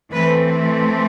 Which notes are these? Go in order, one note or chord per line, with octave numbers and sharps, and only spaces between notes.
E3 A3 C4 B4